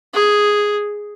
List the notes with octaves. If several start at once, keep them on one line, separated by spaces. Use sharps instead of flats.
G#4